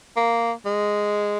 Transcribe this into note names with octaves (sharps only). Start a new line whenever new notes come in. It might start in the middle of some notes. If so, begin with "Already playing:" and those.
A#3
G#3